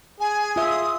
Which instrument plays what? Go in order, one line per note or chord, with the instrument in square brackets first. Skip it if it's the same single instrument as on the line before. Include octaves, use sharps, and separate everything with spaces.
[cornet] G#4 [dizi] G#5
[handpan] F4 E5 [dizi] D#6